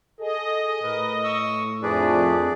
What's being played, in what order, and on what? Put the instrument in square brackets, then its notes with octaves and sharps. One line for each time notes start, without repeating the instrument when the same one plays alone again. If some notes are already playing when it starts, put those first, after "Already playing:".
[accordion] G#4 [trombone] A4 [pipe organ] D#5
[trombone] A2 [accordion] A#4 B4
[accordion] C#6 D#6 E6
[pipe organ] F2 [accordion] F3 A3 D4 [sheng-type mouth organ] G#4 B4 D5